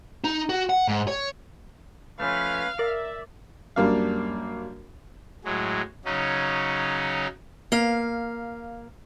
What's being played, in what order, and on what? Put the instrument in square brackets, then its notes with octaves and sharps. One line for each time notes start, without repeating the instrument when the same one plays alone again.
[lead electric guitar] D#4
F#4
F#5
G#2
C#5
[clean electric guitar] F3 A3 [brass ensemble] C#4 B4 [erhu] F5
[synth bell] A#4 [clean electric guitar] D5 [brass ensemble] E5
[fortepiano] F#2 G3 A#3 D4 F5
[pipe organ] A2 F#3 G#3
C#3 F#3 C#4 D#4
[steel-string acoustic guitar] A#3 F5